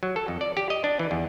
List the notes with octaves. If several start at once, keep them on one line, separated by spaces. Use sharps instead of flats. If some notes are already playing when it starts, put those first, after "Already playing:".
F#3
A4
F2
D5
G4
D#5
D4
E3
E2